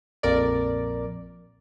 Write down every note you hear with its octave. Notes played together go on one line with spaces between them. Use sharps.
A#1 F2 A#4 D5